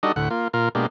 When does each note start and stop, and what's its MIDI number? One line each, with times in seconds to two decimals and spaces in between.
0.03 0.12 55
0.03 0.12 62
0.03 0.12 63
0.03 0.12 66
0.03 0.12 69
0.03 0.12 75
0.16 0.29 38
0.16 0.29 45
0.16 0.29 78
0.30 0.48 58
0.30 0.48 65
0.54 0.69 46
0.54 0.69 65
0.54 0.69 70
0.75 0.86 47
0.75 0.86 56
0.75 0.86 58
0.75 0.86 62
0.75 0.86 67